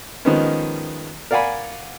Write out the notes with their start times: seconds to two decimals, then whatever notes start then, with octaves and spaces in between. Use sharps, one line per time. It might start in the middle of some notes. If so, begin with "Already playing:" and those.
0.25 D#3 F3 G#3 B3 C#4
1.31 A#4 D5 F5 F#5 G#5 B5